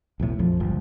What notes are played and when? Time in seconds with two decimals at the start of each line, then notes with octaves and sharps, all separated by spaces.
0.20 B1 E2 A2
0.39 A#1 F2 F3
0.60 G1 C#2 G2 F3